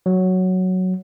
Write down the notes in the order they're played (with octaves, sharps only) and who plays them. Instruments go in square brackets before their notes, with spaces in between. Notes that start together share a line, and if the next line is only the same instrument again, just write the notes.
[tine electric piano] F#3